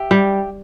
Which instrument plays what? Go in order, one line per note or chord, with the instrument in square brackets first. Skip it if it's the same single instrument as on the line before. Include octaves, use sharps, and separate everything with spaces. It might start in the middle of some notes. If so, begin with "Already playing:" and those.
Already playing: [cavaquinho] G4 E5
[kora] G3